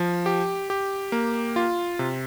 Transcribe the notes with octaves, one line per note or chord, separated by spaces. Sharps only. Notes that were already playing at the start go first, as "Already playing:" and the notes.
Already playing: F3
G4
G4
A#3
F4
C3